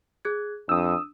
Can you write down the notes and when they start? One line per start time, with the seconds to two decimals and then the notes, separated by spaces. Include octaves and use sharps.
0.25 G#4 F#6 G#6
0.69 F2 D4 D#6 E6